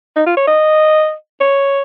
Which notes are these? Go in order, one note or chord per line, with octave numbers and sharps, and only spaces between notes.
D#4
F4
C#5
D#5
C#5